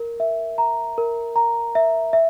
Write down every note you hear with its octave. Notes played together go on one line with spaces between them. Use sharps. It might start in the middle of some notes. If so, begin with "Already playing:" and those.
Already playing: A#4
E5
A#5
A#4
A#5
E5
E5